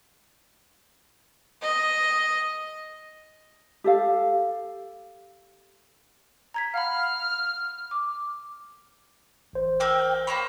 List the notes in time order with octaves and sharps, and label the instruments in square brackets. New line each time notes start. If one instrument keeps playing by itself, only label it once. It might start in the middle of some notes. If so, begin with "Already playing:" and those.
[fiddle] D#5
[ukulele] G4 A4 F5
[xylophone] A#5 G#6 B6
[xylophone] F5 F#5 B5 [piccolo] F6
[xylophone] D6
[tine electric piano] A1 C5
[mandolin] A#4 D6 E6 [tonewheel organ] G5
[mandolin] A#3 C5 C#5 [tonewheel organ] B5